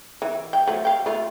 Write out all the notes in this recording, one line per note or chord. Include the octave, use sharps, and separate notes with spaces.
E3
G5
F3 F#3 A3
F5 G5
A3 F4